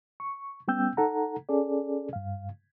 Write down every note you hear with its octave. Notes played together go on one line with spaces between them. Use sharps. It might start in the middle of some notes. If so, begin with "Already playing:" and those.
C#6
G3 B3 C#4 G5 E6 G6
D#4 A4 F#5 A#5
C#4 G#4 A4 D5
G2 F5